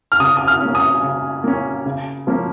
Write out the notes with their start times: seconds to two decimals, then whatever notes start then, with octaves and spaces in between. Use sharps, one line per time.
0.12 F6
0.20 C#3 D#6
0.37 D#6
0.48 F6
0.61 A#3 C#4
0.75 D#6
1.03 C#3
1.44 A#3 C#4
1.86 C#3
2.27 F3 A#3 C#4